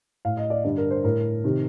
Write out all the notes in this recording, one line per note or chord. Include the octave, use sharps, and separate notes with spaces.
A2 F5
D#5
D5
G2 D3
A#4
C5
A2 A#4
C3 D#3